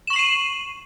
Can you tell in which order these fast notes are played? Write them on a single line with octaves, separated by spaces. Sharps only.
E7 C#6 F#7 C7 D#7